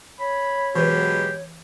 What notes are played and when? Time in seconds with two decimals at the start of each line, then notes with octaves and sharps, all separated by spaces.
0.20 C#5 B5
0.75 B2 E3 F#3 G#3 G4 B4